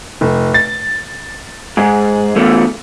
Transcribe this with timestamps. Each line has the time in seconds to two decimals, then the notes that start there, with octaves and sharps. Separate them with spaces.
0.21 F1
0.54 A6
1.77 G#2 G#4
2.36 E2 A3